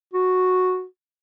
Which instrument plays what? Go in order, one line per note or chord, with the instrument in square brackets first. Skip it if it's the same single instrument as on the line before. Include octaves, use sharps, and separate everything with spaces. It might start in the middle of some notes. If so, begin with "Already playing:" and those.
[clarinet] F#4